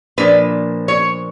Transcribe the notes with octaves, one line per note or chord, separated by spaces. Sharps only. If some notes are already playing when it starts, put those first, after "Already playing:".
A#2 F3 A#3 D4 B4
C#5